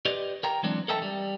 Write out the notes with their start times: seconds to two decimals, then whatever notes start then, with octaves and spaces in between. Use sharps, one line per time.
0.05 G4 B4 C5 D5 D#5
0.43 A#4 G5 A#5
0.63 E3 F#3 G#3 C4 D4
0.88 A4 A#4 D#5 E5 G5 A5
1.02 G3